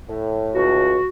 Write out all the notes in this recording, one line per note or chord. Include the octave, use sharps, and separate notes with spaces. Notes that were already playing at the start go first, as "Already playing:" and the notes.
A2
C#2 F#4